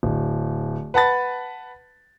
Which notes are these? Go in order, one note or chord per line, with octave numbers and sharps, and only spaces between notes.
D1
B4 F#5 A5 B5 A6